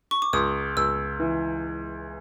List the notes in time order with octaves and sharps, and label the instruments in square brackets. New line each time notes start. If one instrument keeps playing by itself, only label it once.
[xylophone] C#6
D6
[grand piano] C#2 [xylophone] D#6
[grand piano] C#2 [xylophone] E6
[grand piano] E3